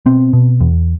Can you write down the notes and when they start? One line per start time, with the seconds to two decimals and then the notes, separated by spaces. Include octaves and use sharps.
0.06 B2 C4
0.33 B2
0.61 E2